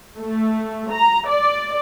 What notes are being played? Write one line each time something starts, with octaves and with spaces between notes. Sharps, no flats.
A3
A#5
D5